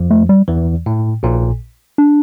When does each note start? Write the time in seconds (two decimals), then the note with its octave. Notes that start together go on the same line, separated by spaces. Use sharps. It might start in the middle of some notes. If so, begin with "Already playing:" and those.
Already playing: F2 F3
0.10 A3
0.29 G3
0.48 E2 E3
0.86 A2
1.23 A#1 A#2
1.98 D4